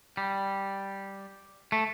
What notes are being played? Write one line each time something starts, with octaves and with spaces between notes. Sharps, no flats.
G3
A3